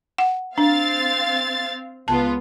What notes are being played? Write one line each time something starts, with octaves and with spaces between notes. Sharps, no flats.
F#5
C4 D4 F5 A6
C#2 B3 F4 A5